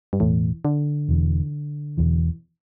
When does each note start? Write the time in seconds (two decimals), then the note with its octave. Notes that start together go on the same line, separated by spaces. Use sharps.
0.13 G2
0.20 E1 E2 A2 E3
0.65 D3
1.08 E1 E2 E3
1.98 E1 E2 E3